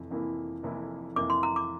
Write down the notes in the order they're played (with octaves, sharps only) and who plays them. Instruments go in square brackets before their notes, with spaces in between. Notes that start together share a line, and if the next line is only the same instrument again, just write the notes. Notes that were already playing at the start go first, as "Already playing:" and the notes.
Already playing: [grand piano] F1 F2 E3 E4
F1 F2 E3 A#3 E4
F1 F2 E3 A#3 E4
[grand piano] F1 F2 E3 A#3 E4 [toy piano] D6
[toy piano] C6
A#5
D6